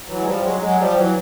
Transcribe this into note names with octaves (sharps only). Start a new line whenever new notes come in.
E3 F#3
G#3
F3 G3
F#3 G#3
F#3 G#3
F3 G3
E3 F#3